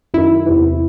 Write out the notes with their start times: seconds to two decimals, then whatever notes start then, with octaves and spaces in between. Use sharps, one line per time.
0.14 F#2 D#3 E4
0.46 E2 C3 E3